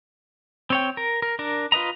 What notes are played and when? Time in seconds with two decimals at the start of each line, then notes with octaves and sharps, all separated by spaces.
0.70 C4 C#5 G5
0.97 A#4
1.22 A#4
1.39 D4 A#4
1.72 F4 B4 D#5 A#5